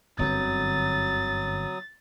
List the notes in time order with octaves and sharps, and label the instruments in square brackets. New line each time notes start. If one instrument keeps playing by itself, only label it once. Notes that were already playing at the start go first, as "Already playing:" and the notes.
[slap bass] G1 F#2 [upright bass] D3 C4 [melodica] F#3 D#6 [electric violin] A6